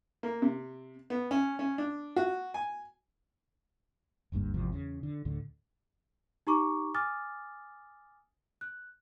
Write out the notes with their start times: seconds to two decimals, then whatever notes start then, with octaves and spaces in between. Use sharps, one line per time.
0.23 A#3
0.42 C3
1.10 B3
1.31 C#4
1.59 C#4
1.78 D4
2.16 F#4
2.54 G#5
4.32 F#1 D2 G2 A#3
4.54 G#1 E2 C3 F3
4.72 E2 C#3
5.03 D3
5.25 D2 A2 D3
6.47 D#4 G4 A#5 C#6 D6
6.94 G#5 D6 D#6 F6 A6
8.61 F#6